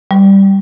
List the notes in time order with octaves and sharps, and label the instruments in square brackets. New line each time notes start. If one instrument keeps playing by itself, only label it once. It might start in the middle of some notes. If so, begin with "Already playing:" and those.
[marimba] G3